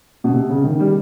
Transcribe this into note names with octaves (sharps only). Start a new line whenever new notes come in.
B2
C3
C#3
D#3
G3